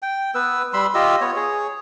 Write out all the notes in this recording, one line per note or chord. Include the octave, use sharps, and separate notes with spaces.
G5
B3 B4 E6
G3 B5 C6 E6
F4 G4 D#5 E6
B3 C#5
G#4 C#5